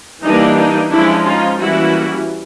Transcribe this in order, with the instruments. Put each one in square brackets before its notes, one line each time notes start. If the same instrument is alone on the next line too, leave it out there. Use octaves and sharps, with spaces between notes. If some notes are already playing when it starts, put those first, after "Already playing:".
[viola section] E3 G3 A#3 D4 D#4
D#4
F3 G#3 C#4 D4 E4
D#4 F4
E3 G3 A#3 C#4 E4 F#4